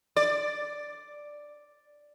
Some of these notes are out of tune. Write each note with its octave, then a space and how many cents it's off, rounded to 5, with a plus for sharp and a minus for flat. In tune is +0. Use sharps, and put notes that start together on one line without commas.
D5 +5